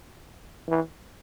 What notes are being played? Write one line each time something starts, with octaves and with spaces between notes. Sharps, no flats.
E3